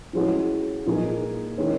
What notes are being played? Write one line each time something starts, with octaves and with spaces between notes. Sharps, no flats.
A2 F3 G#3 C#4 F#4
A#2 F3 A#3 D#4 G#4
D#3 G#3 C#4 E4